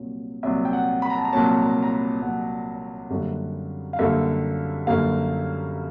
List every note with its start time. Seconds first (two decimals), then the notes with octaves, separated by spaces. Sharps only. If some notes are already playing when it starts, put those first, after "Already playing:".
Already playing: C2 A#2 F#3
0.43 C2 A#2 F#3 E5
0.65 G5
0.73 F#5
1.02 B5
1.10 A#5
1.18 A5
1.25 A#5
1.33 C2 A#2 F#3 A5
1.62 A#5
1.83 A#5
1.91 B5
2.21 C2 A#2 F#3 F#5
3.10 F#2 D3 G3 A#3
3.93 F5
3.99 F#2 D3 G3 A#3 E5
4.87 F#2 D3 G3 A#3 F5